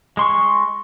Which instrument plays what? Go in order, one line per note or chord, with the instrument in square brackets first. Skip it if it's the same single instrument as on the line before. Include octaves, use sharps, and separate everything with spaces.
[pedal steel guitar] G#3 C6 C#6